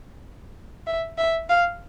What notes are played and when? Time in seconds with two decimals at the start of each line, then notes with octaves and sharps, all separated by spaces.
0.87 E5
1.18 E5
1.50 F5